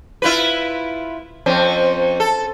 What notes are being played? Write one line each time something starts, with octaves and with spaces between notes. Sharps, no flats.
E4 F4 B4
F2 C4 C#4
A4